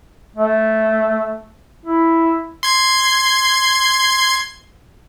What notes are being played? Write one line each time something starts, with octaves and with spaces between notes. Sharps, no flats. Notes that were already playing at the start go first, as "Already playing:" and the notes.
A3
E4
C6 G#6